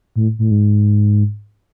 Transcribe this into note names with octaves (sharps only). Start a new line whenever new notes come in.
A2
A2
G#2